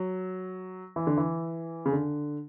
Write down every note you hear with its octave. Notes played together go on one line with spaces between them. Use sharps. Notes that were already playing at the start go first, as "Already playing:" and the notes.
Already playing: F#3
E3
D3
E3
C#3
D3